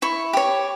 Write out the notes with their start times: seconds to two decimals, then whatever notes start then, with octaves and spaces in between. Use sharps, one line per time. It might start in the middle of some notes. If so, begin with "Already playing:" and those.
0.02 E4 C#6
0.33 G4 C#5